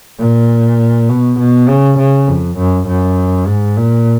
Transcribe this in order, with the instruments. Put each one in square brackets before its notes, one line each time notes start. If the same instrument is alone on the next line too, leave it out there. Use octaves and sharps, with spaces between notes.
[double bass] A#2
B2
B2
C#3
C#3
F2
F#2
F#2
G#2
A#2